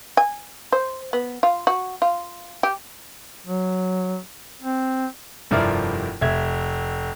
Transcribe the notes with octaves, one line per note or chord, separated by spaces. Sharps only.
G#5
C5
B3
F4
F#4
F4
G4
F#3
C4
F1 G2 F3 E4 A#4 D5
F1 E5 G#6